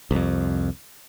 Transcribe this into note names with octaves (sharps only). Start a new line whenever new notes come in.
C2 F2